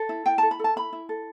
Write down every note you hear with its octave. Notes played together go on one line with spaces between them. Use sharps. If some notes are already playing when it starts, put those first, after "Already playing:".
Already playing: A4
E4
E4 G5
A4 A5
B5
A4 A5
E4 B5
E4
A4